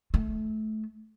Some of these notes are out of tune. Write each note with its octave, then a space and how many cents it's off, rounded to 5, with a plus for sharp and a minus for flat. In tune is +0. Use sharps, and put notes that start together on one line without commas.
A3 -20